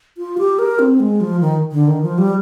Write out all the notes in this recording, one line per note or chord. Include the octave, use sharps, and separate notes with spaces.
F4
G4
A#4
C4
G#3
F3
D#3
D3
D#3
F3
G3